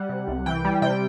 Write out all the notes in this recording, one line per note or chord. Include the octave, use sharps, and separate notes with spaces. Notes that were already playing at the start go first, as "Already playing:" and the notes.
Already playing: G3 F#5
C3
C2
E3 G5
G3
C3 G5